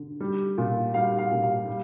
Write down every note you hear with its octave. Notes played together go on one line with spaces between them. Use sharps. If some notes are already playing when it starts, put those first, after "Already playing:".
Already playing: D3
G3
A#2
G3 F5
F5
A#2
F5
G3